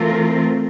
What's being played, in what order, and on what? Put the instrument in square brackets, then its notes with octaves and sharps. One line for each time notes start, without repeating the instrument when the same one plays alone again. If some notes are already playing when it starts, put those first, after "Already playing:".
Already playing: [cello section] E3 A3 C4 F4 A#4